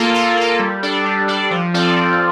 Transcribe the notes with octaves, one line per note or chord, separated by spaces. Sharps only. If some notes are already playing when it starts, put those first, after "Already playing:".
Already playing: A#3 F4 A4
A#3
F4 A4
G3
D4 A4 D5
G3
D4 A4 D5
F3
C4 F4 A4 D5
F3